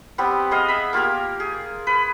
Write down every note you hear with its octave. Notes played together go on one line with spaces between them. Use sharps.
G3 B3 C4 G4
B3 G#4 D#5 F5
E5 B5
A#3 F4 G4 A#4
G#4
B4